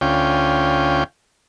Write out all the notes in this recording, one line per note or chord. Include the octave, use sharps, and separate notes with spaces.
D2 C#4 F4 G5